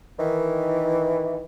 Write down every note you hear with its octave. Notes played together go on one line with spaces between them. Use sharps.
D#3 E3